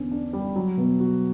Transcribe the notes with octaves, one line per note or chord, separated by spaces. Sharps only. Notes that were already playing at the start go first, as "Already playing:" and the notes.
Already playing: E2 D3 C#4
D4
G3
F#3
B2
F#4